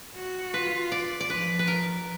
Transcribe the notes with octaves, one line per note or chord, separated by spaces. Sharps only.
F#4
F4 B4
D5
D5
F3 B4
B4
A#4